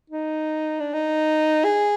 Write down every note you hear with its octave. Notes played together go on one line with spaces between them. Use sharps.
D#4
D4
D#4
G#4